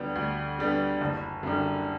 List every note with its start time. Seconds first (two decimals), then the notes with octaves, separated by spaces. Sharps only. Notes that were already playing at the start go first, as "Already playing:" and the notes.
Already playing: D2 D3 G3 B3
0.16 D2
0.59 D3 G3 B3
1.01 F#1
1.43 F#2 D3 G3